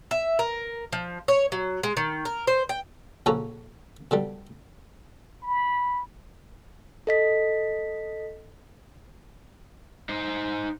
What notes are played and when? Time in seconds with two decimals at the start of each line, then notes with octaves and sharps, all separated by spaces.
0.11 E5
0.39 A#4
0.93 F3
1.28 C#5
1.52 F#3
1.83 G#3
1.97 D#3
2.25 A#4
2.47 C5
2.69 G5
3.26 A#1 C#3 F3 F#4 A4 A#5
4.11 B2 D3 G3
5.43 B5
7.07 A4 D#5 B6
10.09 D#4 C5